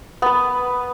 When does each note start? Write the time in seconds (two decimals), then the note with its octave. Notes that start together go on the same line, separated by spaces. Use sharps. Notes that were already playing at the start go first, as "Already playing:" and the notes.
0.22 B3 B4